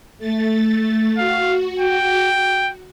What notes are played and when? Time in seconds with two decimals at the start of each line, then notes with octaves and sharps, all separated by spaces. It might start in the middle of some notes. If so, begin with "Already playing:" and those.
0.18 A3 A6
1.18 F#4 F5
1.79 G5